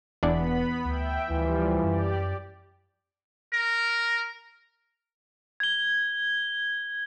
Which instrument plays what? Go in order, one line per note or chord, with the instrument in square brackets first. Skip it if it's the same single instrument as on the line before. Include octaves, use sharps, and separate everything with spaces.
[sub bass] E1 [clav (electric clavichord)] E2 D4 D5 [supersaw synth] B3 B5
[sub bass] D2 [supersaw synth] E5 G5
[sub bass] D2 [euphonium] E3 [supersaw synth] F3 G3
[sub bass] F#2 [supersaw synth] G4 D5
[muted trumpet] A#4
[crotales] G#6 G7